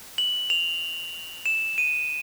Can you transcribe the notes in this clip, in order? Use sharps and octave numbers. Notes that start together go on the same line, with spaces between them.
F#7
F7
E7
D#7